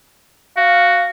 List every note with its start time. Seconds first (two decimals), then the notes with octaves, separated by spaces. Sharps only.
0.57 F#4 F5